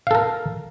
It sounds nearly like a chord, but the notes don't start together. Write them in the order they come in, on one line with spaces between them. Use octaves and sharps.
F5 A4 A#4